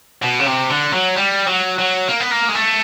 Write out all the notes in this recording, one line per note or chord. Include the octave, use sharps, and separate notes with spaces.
B2
C#3
C3
D3
F#3
G3
F#3
F#3
A#3
B3
A#3
G#3
A3